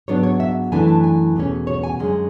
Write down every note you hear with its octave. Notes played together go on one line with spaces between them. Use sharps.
G#2 F#3 B3 D4 C#5
C#5
E5
F#2 E3 A3 D4 G#5
A5
G#5
E2 B2 A3 C#4
C#5
G#5
F#2 D3 G#3 C#4